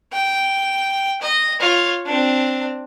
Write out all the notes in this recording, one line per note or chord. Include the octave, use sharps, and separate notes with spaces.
G5
D#5
F4 C#5
C4 D4